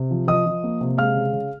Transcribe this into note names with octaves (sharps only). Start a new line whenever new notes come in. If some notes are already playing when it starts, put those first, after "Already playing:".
Already playing: C3
F3
F3 D#5 D#6
F3
A#3
C3
G#3 F5 F6
C#3
C#3